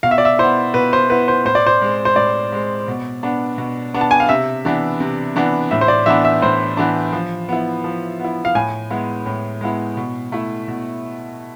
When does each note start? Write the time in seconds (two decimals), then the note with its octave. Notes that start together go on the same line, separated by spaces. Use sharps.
0.03 B2 F5
0.11 E5
0.18 D5
0.25 E5
0.38 B3 E4 C5
0.74 B2 B4
0.93 C5
1.10 B3 E4 B4
1.28 C5
1.45 A2 C5
1.55 D5
1.66 C5
1.82 G#3 C4
2.05 C5
2.16 A2 D5
2.52 G#3 C4
2.88 B2
3.23 B3 D4
3.58 B2
3.94 B3 D4
4.01 A5
4.11 G#5
4.20 F5
4.29 C3 E5
4.65 E3 B3 D4
5.00 C3
5.36 E3 B3 D4
5.71 A2 E5
5.81 C5
5.88 D5
6.06 E3 B3 D4 E5
6.25 E5
6.42 A2 C5
6.77 E3 B3 D4
7.13 F3
7.49 B3 E4
7.84 F3
8.20 B3 E4
8.45 F5
8.55 A2 G#5
8.90 G#3 B3 E4
9.26 A2
9.61 G#3 B3 E4
9.97 B2
10.32 A3 E4
10.68 B2